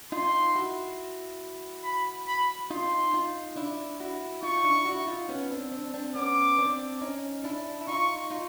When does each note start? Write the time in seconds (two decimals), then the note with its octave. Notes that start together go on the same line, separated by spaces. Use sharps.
0.12 D#4 F4 C6
0.56 E4 F#4
1.84 B5
2.28 B5
2.71 D#4 F4 C6
3.14 D#4 F4
3.57 D4 E4
4.00 E4 F#4
4.43 D#4 F4 C#6
4.64 D4 E4
4.85 E4 F#4
5.07 D#4 F4
5.29 B3 C#4
5.51 C4 D4
5.72 C4 D4
5.94 C4 D4
6.15 B3 C#4 D6
6.58 C4 D4
7.01 C#4 D#4
7.44 D4 E4
7.81 E4
7.88 D#4 F4 C#6
8.30 D#4 F4